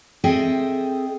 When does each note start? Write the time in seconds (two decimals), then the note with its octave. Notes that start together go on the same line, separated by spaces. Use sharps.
0.24 C4 G#4 A4 D#5 E5 G5